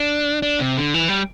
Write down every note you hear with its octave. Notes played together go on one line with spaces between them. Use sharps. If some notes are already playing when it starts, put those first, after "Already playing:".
Already playing: D4
D4
C3
D3
E3
G3